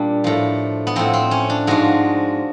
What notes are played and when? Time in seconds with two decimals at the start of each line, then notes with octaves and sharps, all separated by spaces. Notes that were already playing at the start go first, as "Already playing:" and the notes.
Already playing: A#2 G3 D4
0.24 A2 F3
0.87 B3
0.96 A2 F3 C4
1.13 C4
1.31 C#4
1.50 D4
1.67 G#2 F3 F#4